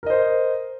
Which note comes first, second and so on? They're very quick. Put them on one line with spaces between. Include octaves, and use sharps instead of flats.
A#4 D#5 C5